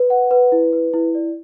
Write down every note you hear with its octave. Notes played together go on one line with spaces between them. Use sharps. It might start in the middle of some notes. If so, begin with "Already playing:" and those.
Already playing: B4
F#5
B4
E4
B4
E4
D5